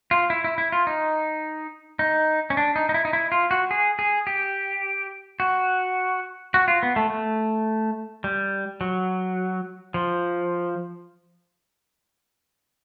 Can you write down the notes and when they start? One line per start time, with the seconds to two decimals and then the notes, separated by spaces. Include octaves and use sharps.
0.11 F4
0.30 E4
0.44 E4
0.58 E4
0.72 F4
0.87 D#4
1.99 D#4
2.50 C#4
2.57 D4
2.76 D#4
2.89 D#4
2.94 E4
3.05 D#4
3.13 E4
3.32 F4
3.51 F#4
3.71 G#4
3.99 G#4
4.27 G4
5.40 F#4
6.54 F#4
6.68 F4
6.83 B3
6.96 A3
7.10 A3
8.24 G3
8.81 F#3
9.94 F3